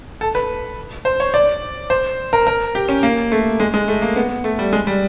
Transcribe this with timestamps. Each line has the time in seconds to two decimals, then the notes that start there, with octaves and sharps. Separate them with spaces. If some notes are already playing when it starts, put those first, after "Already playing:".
0.21 A4
0.35 B4
1.05 C5
1.20 C#5
1.34 D5
1.90 C5
2.33 A#4
2.47 A#4
2.75 G4
2.89 C#4
3.03 A#3
3.32 A3
3.60 G#3
3.74 G#3
3.88 A3
4.02 A#3
4.16 B3
4.44 A3
4.59 G3
4.73 G#3
4.87 G3